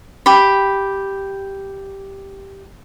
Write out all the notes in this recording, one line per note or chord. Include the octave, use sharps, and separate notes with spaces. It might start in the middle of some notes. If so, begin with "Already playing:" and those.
G4 B5